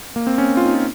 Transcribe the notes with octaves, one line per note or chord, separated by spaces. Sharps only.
A#3
C4
C#4
F4
D#4
F4